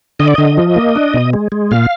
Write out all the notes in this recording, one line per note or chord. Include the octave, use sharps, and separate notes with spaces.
D3 D#5
D5
D3 D#5
F3
A#3
D4
B2
G#3
G#3
A#2 F5